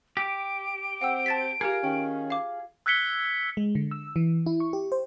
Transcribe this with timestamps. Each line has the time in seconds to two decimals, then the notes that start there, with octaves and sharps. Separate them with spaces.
0.17 G4 D7
1.01 C4 C5 F#5 G5 E6
1.26 A5 A6 B6
1.61 F4 G4 G#4 A#4 C#7
1.84 D#3 C#4 G5
2.30 F5 D6
2.86 E6 F#6 G#6 B6 C#7 G7
3.57 G#3
3.75 D3
3.91 E6
4.16 E3
4.46 E4
4.60 C#6
4.73 G4
4.92 C5